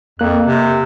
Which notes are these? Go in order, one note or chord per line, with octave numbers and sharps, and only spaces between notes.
F2 A#3 F#6
C3